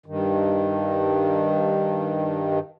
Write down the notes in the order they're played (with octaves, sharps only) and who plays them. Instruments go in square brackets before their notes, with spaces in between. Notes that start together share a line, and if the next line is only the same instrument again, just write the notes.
[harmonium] G2 D#3